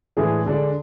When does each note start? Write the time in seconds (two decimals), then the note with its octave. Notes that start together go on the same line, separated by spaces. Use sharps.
0.17 A2 E3 G#3 D4 G#4
0.45 D3 G#3 D4 A4 D5